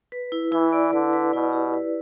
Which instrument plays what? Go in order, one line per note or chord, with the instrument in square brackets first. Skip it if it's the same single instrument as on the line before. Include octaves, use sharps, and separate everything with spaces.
[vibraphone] B4
E4
[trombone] E3 [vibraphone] E4
[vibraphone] D5
[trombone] D3 [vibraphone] B4
[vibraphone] B4
[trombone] B2 [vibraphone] E4
[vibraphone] G4
B4